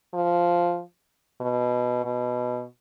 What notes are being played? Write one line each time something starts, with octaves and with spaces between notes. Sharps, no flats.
F3
B2
B2